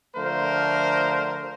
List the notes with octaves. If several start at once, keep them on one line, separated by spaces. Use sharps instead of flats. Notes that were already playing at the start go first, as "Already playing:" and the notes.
D3 F3 A3 A#4 C5